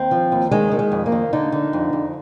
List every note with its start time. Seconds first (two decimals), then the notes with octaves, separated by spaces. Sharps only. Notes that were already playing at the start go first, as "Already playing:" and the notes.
Already playing: D#2 C4
0.11 F3
0.32 D#2
0.51 D#3 G#3
0.72 D#3
0.79 G#3
0.92 F2
1.06 A#3
1.12 D#3
1.33 D3 D#4
1.52 D3
1.73 F2
1.93 F2